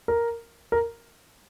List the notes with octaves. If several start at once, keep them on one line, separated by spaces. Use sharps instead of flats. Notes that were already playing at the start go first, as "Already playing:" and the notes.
A#4
A#4